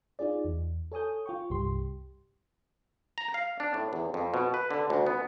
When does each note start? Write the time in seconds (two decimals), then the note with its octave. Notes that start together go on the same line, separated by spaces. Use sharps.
0.19 D#4 F4 G#4 D5
0.45 E2
0.92 A4 C#5 G#5 D#6 G6
1.26 F4 G5 C#6
1.50 C2 G2 G4 C6
3.18 A#5
3.34 F5
3.60 D4
3.74 A2
3.93 E2
4.14 F2
4.34 B2
4.54 B4
4.71 D3
4.90 D2
5.07 B3